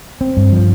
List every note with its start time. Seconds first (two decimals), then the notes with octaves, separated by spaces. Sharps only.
0.21 C4
0.37 G2
0.52 F3